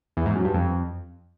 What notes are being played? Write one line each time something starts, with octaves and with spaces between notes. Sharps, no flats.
E2
G#2
F#2
G2
F2